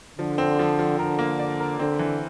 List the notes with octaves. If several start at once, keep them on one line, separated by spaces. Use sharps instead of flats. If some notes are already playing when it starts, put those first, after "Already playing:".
D3 F3
C4
F3
F3
D3 A#4
A#3
D5
A#4
D3 C4
E3